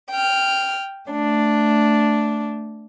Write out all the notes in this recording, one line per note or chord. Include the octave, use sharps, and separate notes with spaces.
G5 F6
A3 D4